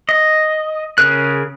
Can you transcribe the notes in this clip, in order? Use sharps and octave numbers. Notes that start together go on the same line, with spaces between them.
D#5
C#3 G#4 A#4 F#6